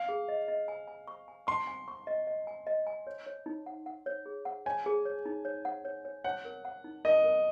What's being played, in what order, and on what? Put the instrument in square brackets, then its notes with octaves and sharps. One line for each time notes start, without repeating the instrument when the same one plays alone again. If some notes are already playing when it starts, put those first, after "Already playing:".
Already playing: [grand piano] F5
[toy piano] G#4
D#5
D#5
G#5
G#5
C#6
G#5
[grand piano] C6 [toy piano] C#6
[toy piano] G#5
C#6
D#5
D#5
G#5
D#5
G#5
C#5
C#5
D#4
F#5
F#5
C#5
G#4
F#5
[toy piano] C#5 [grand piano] G#5
[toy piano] G#4
C#5
D#4
C#5
F#5
C#5
C#5
[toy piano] C#5 [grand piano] F#5
[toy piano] A#4
F#5
D#4
[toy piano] A#4 [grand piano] D#5
[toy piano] A#4